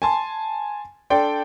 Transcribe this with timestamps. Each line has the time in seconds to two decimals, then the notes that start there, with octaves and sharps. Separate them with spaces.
0.02 G#5 A5 C6
1.10 D4 A4 D5 G5 C6